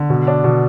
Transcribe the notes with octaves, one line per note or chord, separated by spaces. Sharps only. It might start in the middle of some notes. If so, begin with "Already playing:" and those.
Already playing: D3
B2
D4
B2